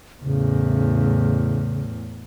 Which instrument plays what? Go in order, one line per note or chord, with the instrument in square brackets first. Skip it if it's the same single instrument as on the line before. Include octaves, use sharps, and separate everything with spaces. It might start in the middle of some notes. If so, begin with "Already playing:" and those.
[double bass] E2 A2 [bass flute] C#3